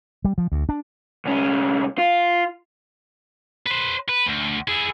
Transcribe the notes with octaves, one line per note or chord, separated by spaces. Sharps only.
G3
F3
D2
D4
C2 C#4
F4
B4 C5
B4
D2
E4 G#4